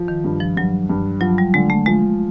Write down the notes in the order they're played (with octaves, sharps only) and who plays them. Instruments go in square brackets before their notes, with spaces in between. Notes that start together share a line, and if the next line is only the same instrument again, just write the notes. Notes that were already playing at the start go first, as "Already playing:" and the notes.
Already playing: [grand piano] F3
[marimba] D#3
[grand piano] G2
[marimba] F3
[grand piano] G2 [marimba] F#3
[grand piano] G2
[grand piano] F3 [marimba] F#3
[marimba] G3
[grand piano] D3 [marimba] G#3
[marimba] A3
[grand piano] F3 [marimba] G#3